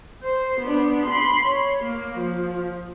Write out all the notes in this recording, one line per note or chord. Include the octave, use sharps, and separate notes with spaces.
C5
B3 D4
B5 C6
C#5
A#3
F3